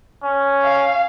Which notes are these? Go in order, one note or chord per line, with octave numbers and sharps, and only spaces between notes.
C#4
F5